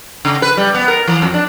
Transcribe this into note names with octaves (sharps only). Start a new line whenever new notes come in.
C#3
B4
G3
B3
A#4
E3
F2
D4